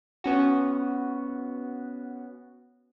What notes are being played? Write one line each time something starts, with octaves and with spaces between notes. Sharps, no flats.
B3 C#4 F#4